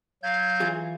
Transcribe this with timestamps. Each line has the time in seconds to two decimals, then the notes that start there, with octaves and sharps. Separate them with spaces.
0.23 F#3 F5 G6 G#6
0.60 E3 F4 G#4